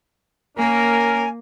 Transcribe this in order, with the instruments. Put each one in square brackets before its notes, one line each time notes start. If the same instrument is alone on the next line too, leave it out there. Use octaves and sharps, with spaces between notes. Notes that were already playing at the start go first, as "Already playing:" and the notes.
[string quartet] A#3 [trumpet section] C#4 A#4 [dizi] G#5